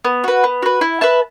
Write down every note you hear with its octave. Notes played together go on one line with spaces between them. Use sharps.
B3
F#4 B4
B3
F#4 B4
E4
B4 E5 A5